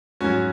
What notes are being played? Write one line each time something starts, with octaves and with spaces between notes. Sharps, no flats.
G#2 F#3 C#4 F#4